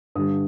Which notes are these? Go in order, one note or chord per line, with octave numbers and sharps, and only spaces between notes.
G2 D3 G3 D#6